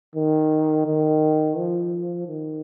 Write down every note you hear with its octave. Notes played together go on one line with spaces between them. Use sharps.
D#3
D#3
F3
D#3